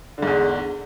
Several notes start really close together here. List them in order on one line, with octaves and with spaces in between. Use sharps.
D3 G#2 E2